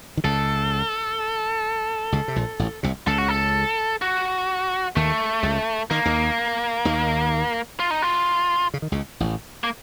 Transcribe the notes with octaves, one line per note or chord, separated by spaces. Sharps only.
D#3
C#2 C#3 A4
C#2 C#3
C3
A#1 A#2
A1 A2
C2 C3
C#2 C#3 A4
F#4
A4
F#4
D#2 D#3 A3
C#2 C#3
D#3 A#3
D#2 D#3
D#2 D#3
F4
D#4
F4
C#3
D#3
C#2 C#3
A1 A2
A#3